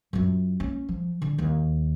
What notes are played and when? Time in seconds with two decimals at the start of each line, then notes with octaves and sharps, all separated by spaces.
0.13 F#2 F4
0.60 A#3 C#4
0.89 F3
1.22 D3
1.38 D#2